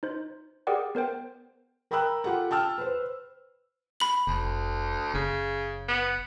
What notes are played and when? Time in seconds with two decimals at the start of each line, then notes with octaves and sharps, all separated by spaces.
0.03 D#4 C5
0.67 G4 G#4 A#4 D5 F#5 G5
0.95 B3 A#4 C5 G5
1.91 A#4 G5 A#5 B5 E6 F#6
2.24 F4 G4 A4 F#5
2.51 G5 A5 E6 F6
2.78 B4 C5
4.00 B5 F#7
4.27 F1 D2
5.14 F#1 C#3
5.88 B3